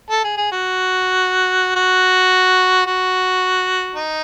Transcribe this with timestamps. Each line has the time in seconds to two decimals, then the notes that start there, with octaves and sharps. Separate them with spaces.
0.10 A4
0.24 G#4
0.37 G#4
0.52 F#4
1.76 F#4
2.86 F#4
3.96 D#4